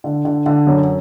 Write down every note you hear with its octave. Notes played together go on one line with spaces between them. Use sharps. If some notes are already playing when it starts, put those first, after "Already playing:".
D3
D3
D3
F#2